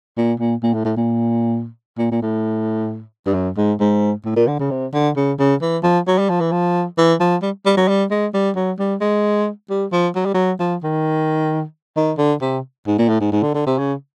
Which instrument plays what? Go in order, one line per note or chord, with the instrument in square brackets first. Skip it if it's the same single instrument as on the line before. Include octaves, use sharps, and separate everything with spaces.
[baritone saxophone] A#2
A#2
A#2
A2
A2
A#2
A#2
A#2
A2
G2
F#2
G#2
G#2
A2
A#2
D3
C#3
C3
D3
C#3
C#3
E3
F3
F#3
G3
F3
E3
F3
E3
F3
G3
G3
F#3
G3
G#3
G3
F#3
G3
G#3
G3
F3
F#3
G3
F#3
F3
D#3
D#3
D3
C3
G#2
A#2
A2
G#2
G#2
D3
D3
C3
C#3